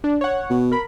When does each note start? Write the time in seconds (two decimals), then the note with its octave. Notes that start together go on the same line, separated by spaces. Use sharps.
0.04 D4
0.21 C#5 F#5
0.50 B2
0.72 A#4 B5